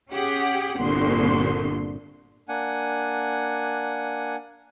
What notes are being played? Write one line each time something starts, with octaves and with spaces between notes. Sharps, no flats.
C#4 G4 G#4 F#5
G1 C2 A#2 D3 C6
A#3 D4 F#5 G#5